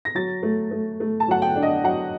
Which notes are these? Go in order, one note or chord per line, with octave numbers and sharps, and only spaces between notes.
A#6
F#3 A6
A3
A3
A3
A5
F#3 F#5
G5
D4
D#5
F#3 F#5